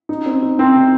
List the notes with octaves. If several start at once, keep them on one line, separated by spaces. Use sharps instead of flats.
D#4
C4
D#4
C4 D#4
C3